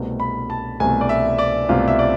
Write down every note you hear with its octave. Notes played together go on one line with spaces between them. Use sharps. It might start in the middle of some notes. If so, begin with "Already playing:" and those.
Already playing: C2 B2 A3 C4
B5
A5
C2 B2 A3 C4 G#5
D5
E5
D5
C2 B2 A3 C4 F4
E5
D5